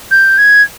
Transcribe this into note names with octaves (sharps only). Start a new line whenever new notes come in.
G6
G#6